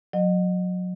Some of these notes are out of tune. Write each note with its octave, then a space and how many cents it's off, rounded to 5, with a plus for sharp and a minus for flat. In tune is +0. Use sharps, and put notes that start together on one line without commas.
F#3 -25 D#5 -30